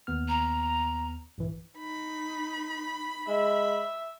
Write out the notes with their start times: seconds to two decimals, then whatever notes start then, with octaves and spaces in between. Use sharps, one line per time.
0.07 D#2 B3 F6
0.28 A#5
1.38 A#1 G2 E3
1.78 D#4 B5
3.28 G#3 E5